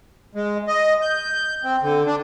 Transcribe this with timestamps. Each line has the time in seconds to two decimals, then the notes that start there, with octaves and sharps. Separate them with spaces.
0.35 G#3
0.67 D#5
1.02 G6
1.64 C4
1.82 D3
2.06 D4